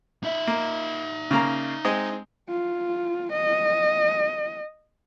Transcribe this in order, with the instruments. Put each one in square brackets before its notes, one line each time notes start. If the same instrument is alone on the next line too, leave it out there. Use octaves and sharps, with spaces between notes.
[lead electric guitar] D#4 E5
[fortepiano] A#3
C#3 A#3 A#5
G#3 C4 D#5
[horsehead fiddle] F4
D#5